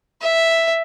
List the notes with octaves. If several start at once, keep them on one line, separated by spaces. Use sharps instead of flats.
E5